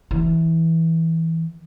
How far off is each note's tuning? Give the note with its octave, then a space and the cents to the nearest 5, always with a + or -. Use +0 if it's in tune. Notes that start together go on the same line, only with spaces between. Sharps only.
E3 -15